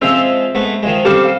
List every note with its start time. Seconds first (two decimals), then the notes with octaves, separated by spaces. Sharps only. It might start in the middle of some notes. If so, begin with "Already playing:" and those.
0.02 F3 G#3 C4 F4 E5 E6
0.55 G#2 A3 B3
0.83 D#3 F3 G#3
1.05 G3 C4 A4 F5 D6 F6
1.24 B4 F5